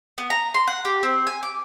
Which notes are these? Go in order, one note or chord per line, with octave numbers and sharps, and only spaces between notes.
B3
A#5
C6
F#5
G4
C4
G#5
D6